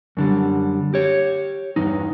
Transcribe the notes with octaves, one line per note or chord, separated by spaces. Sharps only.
F#2 D3 G3
G4 C#5
E2 G2 D#4